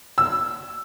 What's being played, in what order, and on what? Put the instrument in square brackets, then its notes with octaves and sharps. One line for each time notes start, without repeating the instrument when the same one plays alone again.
[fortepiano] E6